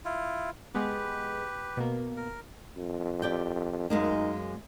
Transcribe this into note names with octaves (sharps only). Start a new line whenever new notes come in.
E4 F4
G#3 B3 G4 B4
B2 A#3
A#4
F2
G4 D5 G5
F#2 G#3 A#3 D#4